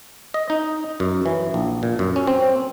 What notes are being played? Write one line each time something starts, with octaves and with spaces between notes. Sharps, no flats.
D#5
D#4
F#2
E3
A#1
A#2
F#2
C#4
C4